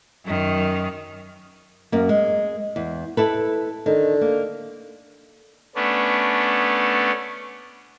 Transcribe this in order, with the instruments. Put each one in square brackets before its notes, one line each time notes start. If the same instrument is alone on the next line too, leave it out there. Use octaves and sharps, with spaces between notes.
[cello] F#2 D#3
[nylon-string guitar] F#2 A#3
G#3
E2
E4 A4 B4
[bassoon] D3 [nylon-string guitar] D#3
[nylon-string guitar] A#3
[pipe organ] A3 B3 C#4 D4